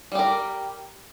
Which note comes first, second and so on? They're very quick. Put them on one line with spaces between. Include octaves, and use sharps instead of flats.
G3 G4 A#4